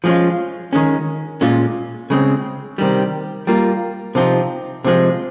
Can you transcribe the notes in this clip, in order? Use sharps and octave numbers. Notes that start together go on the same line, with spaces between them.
F3 G#3 C#4 F4
D#3 G#3 C#4
A#2 G#3 C#4 F4
C#3 G#3 C4
C3 D#3 G3
G3 A#3 F4
C3 F3 C4 D#4
C3 F3 G#3